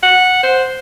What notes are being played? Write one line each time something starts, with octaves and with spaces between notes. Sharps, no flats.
F#5
C5